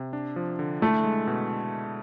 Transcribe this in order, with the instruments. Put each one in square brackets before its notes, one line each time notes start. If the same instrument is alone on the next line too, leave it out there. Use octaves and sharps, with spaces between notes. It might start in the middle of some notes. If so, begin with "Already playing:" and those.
Already playing: [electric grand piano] C3
D4
F3
D3
[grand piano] A3 [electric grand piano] E4
[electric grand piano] G#3
B2